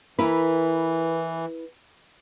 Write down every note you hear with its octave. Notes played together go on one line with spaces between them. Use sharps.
E3 E4 A#4 B4